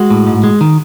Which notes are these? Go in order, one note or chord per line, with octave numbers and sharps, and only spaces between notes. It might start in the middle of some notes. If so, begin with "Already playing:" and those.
Already playing: G#3 F#4
A2
G#2
G#3
D#3